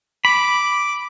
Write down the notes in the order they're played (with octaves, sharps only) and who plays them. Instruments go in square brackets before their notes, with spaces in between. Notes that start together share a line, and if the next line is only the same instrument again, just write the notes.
[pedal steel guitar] B5 [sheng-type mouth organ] D6